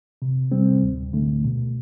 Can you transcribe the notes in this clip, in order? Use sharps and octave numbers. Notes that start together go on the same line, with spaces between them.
C3
G3 C4
D2
D3 A3
B2